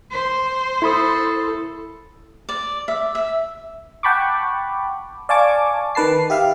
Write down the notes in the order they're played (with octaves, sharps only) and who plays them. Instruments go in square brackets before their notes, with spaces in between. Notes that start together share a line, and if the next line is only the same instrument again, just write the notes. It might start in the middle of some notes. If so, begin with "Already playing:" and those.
[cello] C5
[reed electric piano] E4 B5 D#6 [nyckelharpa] A4
[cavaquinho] D5
E5
E5
[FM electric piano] F#5 G5 A5 B5 C#6 D6
D5 F5 G#5 A5 C#6 D6
D#3 B4 A5 C7
G4 E5 F5